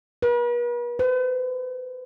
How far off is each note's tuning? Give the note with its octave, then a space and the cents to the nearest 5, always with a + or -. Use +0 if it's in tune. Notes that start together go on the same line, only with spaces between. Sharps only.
B4 -45
B4 +45